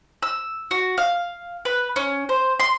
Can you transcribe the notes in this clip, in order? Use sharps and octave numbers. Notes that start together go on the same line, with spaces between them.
E6
F#4
F5
B4
C#4
C5
C6